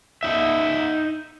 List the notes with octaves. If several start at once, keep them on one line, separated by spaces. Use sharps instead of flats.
D#4 E5